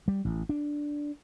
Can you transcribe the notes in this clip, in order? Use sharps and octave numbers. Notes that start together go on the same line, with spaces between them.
G3
A1
D4